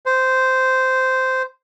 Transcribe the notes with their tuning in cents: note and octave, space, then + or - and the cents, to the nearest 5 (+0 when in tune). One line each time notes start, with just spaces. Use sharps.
C5 -10